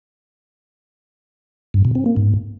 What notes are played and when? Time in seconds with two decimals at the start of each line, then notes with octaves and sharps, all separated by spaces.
1.74 G2
1.85 B2
1.95 C4
2.06 A#3
2.17 G#2